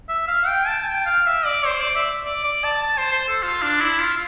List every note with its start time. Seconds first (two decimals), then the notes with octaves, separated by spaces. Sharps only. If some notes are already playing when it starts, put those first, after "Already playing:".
0.09 E5
0.28 F5
0.48 G5
0.68 A5
0.87 G5
1.06 F5
1.26 E5
1.46 D5
1.66 C5
1.80 D5
1.96 E5
2.25 D5
2.44 D5
2.64 A5
2.83 A5
2.98 C5
3.12 C5
3.28 A4
3.43 F4
3.62 D4
3.81 E4
4.01 F4